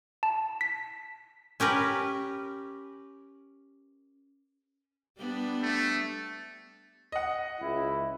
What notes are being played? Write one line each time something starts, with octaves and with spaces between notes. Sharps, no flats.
A5
B6
C#4 G4 A#4 B4
G3 B3 D4
A3
D#5 F#5
C#2 E4